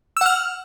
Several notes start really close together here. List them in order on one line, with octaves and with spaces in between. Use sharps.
E6 F#5 F6